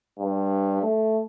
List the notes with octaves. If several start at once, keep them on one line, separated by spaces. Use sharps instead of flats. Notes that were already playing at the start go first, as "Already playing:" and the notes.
G2
A3